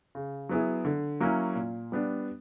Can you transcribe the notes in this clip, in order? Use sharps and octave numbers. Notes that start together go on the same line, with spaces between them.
C#3
F#3 B3 E4 G#4
D3
F#3 A#3 C#4 E4
A#2
G3 B3 D4